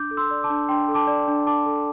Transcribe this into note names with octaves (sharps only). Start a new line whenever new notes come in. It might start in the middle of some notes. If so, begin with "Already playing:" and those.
Already playing: D4 D6 G6
A4
C6 E6
D5
A5 D6
D4
D4 G5 C6
A4
A5 D6
D5
D4
D4 A5 D6
A4